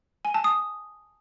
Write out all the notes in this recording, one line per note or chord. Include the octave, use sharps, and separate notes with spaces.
G#5
A5
D#6